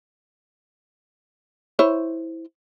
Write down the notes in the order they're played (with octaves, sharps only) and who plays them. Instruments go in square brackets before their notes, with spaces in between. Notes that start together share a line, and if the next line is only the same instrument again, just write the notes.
[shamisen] E4 C5 C#5